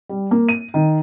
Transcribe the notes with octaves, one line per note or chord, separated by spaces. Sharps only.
G3
A#3
D#7
D#3